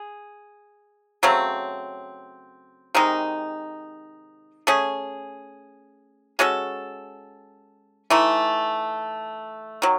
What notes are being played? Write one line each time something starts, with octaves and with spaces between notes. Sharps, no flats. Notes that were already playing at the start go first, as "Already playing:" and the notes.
Already playing: G#4
C#3 F#3 A3 C4
C3 D#3 G#3 D#4
A3 C#4 G#4
G#3 C#4 F#4 A4
E3 A3 D#4
D#3 F#3